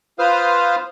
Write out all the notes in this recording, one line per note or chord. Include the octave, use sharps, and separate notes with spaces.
F4 B4 C5 F5 D#6 F6